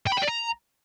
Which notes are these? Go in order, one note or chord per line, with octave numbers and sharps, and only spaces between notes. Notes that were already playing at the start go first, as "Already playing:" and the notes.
G5
B5
G5
D5
A#5